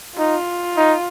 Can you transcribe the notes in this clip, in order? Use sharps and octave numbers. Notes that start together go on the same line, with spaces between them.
D#4 F4
D#4